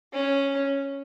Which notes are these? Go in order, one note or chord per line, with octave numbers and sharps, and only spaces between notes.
C#4